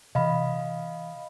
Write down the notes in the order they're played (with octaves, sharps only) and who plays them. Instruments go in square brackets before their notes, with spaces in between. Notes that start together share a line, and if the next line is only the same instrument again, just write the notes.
[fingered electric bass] C3 E3 [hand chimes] D#5 F5 B5